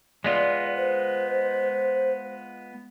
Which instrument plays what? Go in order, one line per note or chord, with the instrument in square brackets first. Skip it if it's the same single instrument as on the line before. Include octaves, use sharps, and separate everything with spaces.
[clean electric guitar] G#3 B3 F4 [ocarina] D5
[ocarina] C5